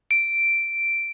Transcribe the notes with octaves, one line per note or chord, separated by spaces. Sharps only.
D7